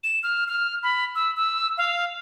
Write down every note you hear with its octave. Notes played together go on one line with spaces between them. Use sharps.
E7
F6
F6
B5
E6
E6
F5